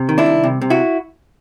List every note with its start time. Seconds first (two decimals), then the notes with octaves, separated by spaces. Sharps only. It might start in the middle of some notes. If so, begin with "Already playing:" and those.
Already playing: C3
0.09 D#3
0.18 D4 E4
0.26 C2
0.44 C3
0.62 C3
0.70 E4 F#4